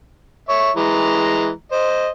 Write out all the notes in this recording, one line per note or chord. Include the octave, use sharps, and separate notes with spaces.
C#5 E5
E3 G#3 A#5
C5 D#5